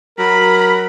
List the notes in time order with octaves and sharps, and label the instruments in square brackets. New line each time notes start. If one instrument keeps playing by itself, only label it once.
[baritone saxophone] F#3 [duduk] A#4 [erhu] B5